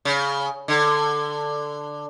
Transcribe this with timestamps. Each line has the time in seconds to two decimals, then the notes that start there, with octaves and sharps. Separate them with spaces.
0.05 C#3
0.68 D3